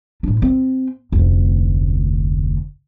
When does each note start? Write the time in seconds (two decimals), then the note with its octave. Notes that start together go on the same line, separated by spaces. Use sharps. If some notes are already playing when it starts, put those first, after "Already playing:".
0.23 A2 D4
0.42 C4
1.12 F1 D2